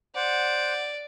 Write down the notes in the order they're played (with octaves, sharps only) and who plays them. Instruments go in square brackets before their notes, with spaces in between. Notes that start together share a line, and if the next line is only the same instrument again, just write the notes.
[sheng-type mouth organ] C5 F#5 [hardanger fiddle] D5